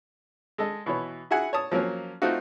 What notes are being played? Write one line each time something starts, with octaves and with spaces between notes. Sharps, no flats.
G#3 A4 D#5
B2 E3 C#5
E4 F#4 G#4 F#5 G#5
C#5 A5 D#6
F3 F#3 A#3 C#4
A3 C4 D#4 F4 F#4